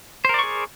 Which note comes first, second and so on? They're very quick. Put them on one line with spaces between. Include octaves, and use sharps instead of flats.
C5 A#4 D5 C#6 G#4